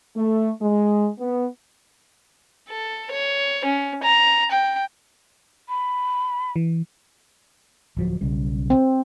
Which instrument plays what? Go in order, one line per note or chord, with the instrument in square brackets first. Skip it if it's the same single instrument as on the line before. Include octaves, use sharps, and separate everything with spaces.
[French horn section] A3
G#3
B3
[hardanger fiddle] A4
C#5
C#4
A#5
G5
[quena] B5
[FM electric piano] E3
[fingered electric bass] D1 F3 F#3
B1 C#3 G3
[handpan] C4